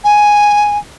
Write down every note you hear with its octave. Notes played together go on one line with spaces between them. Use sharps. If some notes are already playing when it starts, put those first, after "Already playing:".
G#5